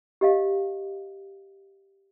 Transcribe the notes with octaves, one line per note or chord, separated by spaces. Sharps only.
G4 D#5 F5